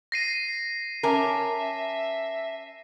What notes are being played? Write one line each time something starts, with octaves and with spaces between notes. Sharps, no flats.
A#6 C7 D#7
C#4 A#4 E5 G#5 A5 D6